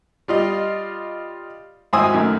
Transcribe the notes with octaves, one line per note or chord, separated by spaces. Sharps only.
G3 F4 D#5
G#1 E4 C5 G#5 D#6 E6
F#2 A2 D#3